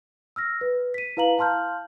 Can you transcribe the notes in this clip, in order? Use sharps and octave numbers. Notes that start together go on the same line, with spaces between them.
E6 F6 A#6
B4
B6 D#7
E4 B4 F5 A#5 F#7
F5 A5 C6 F6 G6